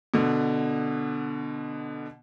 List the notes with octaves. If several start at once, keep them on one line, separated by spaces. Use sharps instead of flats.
B2 D3